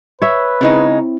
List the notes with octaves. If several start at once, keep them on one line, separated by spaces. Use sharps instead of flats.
B4 C#5 E5
C#3 G#3 C4 D#4 E4